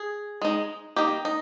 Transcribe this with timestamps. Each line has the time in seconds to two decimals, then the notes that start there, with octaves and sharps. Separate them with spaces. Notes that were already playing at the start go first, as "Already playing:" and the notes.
Already playing: G#4
0.42 G#3 D#4
0.96 D#3 A#3 D#4 G4
1.25 D#4